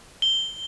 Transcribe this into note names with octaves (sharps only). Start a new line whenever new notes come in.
G7